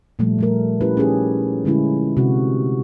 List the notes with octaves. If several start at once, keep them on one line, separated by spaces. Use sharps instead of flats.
A#2 F3 G3 A3
G3 A3 A#4
C#4 E4 G4 B4
C#4 D#4 G4 G#4
D3 G#3 C#4 E4 F4
C3 F#4